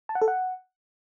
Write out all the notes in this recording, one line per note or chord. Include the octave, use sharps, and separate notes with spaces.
A5
F#5
A4
F#5